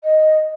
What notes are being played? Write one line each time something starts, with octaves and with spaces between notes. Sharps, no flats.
D#5